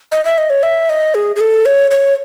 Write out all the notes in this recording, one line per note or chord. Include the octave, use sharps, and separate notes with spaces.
D#5
E5
D#5
C#5
E5
D#5
G#4
G#4
A4
C#5
C#5